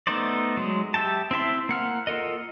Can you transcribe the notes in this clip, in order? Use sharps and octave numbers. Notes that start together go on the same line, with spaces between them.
A3 B3 D#4 C5 D5
F#3 G#3
G4 E5 G5 A5
C4 E4 E5 C6
A#3 F#5 F6
F4 A4 A#4 D#5